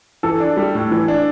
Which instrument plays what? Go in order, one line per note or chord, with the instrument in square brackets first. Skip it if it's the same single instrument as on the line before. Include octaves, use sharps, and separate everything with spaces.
[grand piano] E3 [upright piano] A4
[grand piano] D4
G3
A2
E3
D4